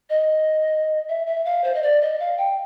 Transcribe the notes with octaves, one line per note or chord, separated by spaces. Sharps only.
D#5
E5
E5
F5
C5
D#5
D5
D#5
F5
G5